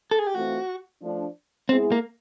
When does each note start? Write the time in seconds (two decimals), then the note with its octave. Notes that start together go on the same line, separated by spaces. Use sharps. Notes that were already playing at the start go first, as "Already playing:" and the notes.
0.11 A4
0.19 G#4
0.27 G4
0.35 E3 A3 C4 F4 F#4
1.02 F3 A3 D4
1.69 G#3 B3 C4 E4 G#4
1.92 A#3